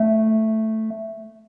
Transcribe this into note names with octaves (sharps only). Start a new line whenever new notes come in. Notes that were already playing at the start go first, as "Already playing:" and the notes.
Already playing: A3